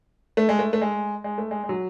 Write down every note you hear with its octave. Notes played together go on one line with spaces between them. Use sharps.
A3
G#3
A3
A3
G#3
G#3
A3
G#3
G#3
F#3